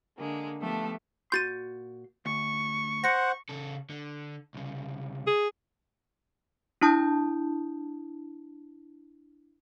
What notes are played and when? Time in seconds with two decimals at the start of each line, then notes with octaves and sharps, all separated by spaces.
0.18 D3 G#3 A#3
0.60 F3 A3 B3 G4 A4
1.32 A#2 F#4 C6 G6 A6 D#7
2.26 D2 C#6
3.04 C5 F#5 A#6 C#7
3.49 C#3 A4
3.90 D3
4.54 C2 C#3
5.27 G#4
6.81 D4 E4 A5 D#6 G6